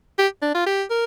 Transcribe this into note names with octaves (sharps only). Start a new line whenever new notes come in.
G4
D4
F4
G4
A#4